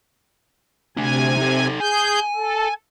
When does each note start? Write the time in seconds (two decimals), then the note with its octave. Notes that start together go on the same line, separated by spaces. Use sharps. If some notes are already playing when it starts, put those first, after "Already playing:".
0.97 C3 A3 D4 G#5
1.37 D#4 A4
1.80 G#4 G#5 G6
2.36 A4